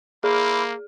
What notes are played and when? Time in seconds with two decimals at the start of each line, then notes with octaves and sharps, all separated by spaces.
0.24 A#3 E4 G#4 C5 D6